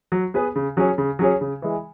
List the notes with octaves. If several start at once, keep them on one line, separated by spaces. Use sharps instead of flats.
F#3
B3 G#4 B4
C#3
F#3 C#4 G#4 C#5
C#3
F#3 C#4 G#4 C#5
C#3
E3 G#3